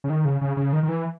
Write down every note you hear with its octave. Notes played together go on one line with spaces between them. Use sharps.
C#3
D#3
C#3
C#3
C#3
D#3
D#3
E3